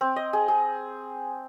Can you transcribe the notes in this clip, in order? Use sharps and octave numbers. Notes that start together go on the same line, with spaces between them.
C4
D#5
G#4
G#4